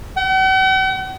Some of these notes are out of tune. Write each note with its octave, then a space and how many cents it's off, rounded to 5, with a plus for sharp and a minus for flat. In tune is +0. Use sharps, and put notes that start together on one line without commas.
F#5 +45